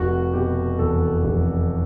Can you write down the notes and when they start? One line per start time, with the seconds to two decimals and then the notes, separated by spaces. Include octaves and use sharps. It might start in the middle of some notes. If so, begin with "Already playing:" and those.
Already playing: F1 F#4
0.33 B2 G4
0.79 E2 A4
1.25 F1